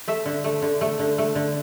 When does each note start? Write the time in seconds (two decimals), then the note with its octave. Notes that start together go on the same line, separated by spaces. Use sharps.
0.08 A3 E5
0.26 D3
0.44 A3
0.62 D3
0.81 A3
0.99 D3
1.18 A3
1.35 D3